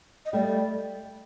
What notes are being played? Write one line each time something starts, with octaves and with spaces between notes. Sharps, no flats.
D#5
G3 A3 D5